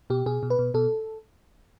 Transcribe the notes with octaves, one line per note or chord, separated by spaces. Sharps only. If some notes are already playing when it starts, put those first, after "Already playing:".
B2 G4
B2 G#4
B2
B4
B2
B2 A4